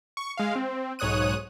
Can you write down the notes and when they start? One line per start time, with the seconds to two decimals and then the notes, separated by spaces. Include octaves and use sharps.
0.17 C#6
0.37 G#3 F5
0.56 C4
0.99 B1 G#2 C#5 D#6 F#6 D#7